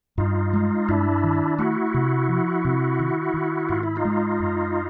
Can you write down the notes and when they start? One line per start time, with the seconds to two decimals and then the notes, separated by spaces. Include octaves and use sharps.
0.18 G2 D#4 F4
0.53 G#3
0.88 G2 D4 E4
1.24 D#3
1.59 A3 E4 F#4
1.94 C3
2.29 F3
2.65 C3
2.99 D#3
3.34 D#3
3.69 G#2 F4
3.83 E4
3.96 D#4 F4
4.05 G#3
4.40 F#2